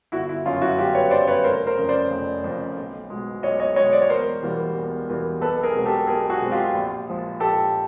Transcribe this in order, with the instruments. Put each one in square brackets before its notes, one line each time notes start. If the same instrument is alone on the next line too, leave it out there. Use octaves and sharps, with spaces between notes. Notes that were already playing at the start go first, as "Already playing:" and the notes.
[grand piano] G1 E4 F#4
E4
F#2 C#3 F4
E4 F#4
G1 F4 G4
B4 C#5
F#2 C#3 C5 D5
B4 C#5
F1 A#4 C5
A#4 C5
F2 C#3
C5 D5
F1
F2 C#3
B1
B2 G#3
B1 C#5 D#5
C#5 D#5
B2 G#3 C#5 D#5
C5 D5
C#5
E1 A#4 C5
E2 B2 G3 A#3
E1
E2 B2 G3 A#3
B1 A4 B4
G#4 A#4
B2 G#3 C4
G4 A4
B1 G#4 A#4
F#4 G#4
B2 G#3 C4
F4 G4
A#1
A#2 F3 G#3
A#1 G4 A4